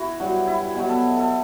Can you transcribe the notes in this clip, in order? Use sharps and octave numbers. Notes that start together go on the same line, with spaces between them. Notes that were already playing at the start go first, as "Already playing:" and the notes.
Already playing: E4 F#4
G2 F#3
E4
B2 F#3
A4
A4